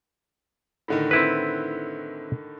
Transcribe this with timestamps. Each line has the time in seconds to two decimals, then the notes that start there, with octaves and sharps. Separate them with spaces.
0.88 A2 D3 D#3
1.11 C4 E4 B4